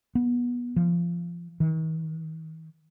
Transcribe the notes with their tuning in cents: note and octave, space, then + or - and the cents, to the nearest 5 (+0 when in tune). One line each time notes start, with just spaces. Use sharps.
B3 -20
F3 -25
D#3 +45